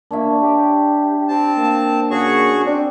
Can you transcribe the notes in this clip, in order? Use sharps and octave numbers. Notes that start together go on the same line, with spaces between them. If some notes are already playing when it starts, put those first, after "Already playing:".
A#3 D4 C#5 E5
G4
C4 A5
A#3
C#3 F#4 G#4 C#6
C4 D4